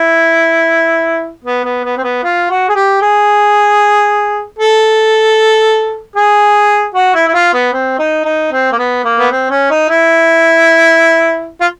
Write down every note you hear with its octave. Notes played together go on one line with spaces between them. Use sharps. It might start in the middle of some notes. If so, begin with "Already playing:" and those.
Already playing: E4
B3
B3
B3
C4
B3
F4
F#4
G#4
G4
G#4
A4
G#4
F#4
E4
E4
F4
B3
C4
D#4
D#4
C4
A#3
B3
A#3
B3
C4
C#4
D#4
E4
F4